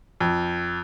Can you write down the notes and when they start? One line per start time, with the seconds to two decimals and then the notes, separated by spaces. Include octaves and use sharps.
0.20 F2